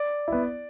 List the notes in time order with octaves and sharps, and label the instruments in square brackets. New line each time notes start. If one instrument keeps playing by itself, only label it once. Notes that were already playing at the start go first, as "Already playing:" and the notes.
Already playing: [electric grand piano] D5
[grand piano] B3 E4